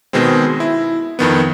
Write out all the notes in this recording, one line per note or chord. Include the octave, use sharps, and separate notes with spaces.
B2 D#3 G#3 B3 C4
E4
F2 D#3 B3